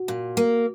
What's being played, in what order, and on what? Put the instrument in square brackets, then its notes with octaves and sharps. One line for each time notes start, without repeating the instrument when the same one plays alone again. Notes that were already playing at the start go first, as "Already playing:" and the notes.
Already playing: [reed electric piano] F#4
[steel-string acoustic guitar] A#2
A#3